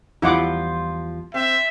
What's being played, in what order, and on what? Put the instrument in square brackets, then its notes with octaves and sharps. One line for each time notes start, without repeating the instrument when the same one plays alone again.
[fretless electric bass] E2 G3 [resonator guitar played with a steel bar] F3 F4 [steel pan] E4 F#5 D6
[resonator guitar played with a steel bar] C4 [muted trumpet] E5